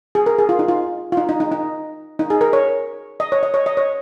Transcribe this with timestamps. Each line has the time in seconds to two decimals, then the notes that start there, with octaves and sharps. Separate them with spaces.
0.15 G#4
0.26 A#4
0.38 G#4
0.49 F4
0.59 D#4
0.68 F4
1.12 F4
1.17 D#4
1.29 D#4
1.40 D#4
1.52 D#4
2.19 D#4
2.30 G#4
2.41 A#4
2.53 C#5
3.20 D#5
3.32 C#5
3.43 D#5
3.54 C#5
3.66 D#5
3.77 C#5